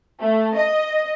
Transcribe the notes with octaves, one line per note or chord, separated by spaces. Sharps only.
A3
D#5